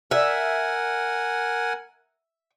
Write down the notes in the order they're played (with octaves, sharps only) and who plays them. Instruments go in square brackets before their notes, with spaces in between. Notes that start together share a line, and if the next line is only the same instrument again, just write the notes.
[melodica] A#4 F#5 G#5 [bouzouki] E5